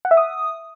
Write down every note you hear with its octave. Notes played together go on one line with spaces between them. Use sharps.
F#5
E5
D#6